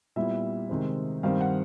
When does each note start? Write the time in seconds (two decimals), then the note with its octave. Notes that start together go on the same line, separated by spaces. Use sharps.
0.16 A#2 G3 B3 E4 E5
0.69 C3 D#3 G#3 C4
1.23 G2 D#3 G3 C4 F5
1.41 F#5